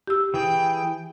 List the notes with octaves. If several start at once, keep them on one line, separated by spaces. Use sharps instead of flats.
G4 E6
E3 G#4 G5